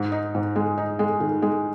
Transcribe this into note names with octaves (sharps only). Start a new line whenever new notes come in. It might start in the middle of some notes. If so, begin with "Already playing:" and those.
Already playing: G#2
D#4
G#2
G#3
D#4
G#3
D#3
G#3